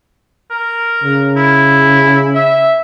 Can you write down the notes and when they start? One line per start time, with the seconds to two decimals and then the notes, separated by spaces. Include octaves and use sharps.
0.51 A#4
1.03 C#3
1.36 E4
2.35 E5